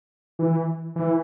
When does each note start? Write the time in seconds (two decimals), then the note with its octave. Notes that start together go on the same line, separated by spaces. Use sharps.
0.39 E3
0.96 E3